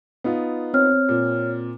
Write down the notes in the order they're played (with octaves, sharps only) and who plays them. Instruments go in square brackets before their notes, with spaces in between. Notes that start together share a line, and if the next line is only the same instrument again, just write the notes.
[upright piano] B3 D#4 F4
[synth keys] C4 [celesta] C#5 F6
[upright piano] A#2